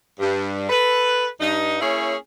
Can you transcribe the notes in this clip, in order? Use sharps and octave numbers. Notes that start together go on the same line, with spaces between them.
G2
A4 B4
G2 D#4
A#3 C#4 E4 G#4 C#5